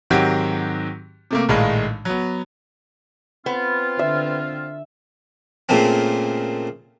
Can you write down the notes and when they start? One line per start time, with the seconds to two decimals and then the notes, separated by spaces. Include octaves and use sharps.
0.10 G#2 D#3 F#3 C4 F#4 G4
1.31 C3 A3 A#3
1.49 A#1 A2 D#3 G#3 D#4 F5
2.05 F#3 B3
3.46 B3 C4 F4
3.99 D3 E5
5.69 A#2 C#3 A3 A#3 C4